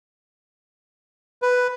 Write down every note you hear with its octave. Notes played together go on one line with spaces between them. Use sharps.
B4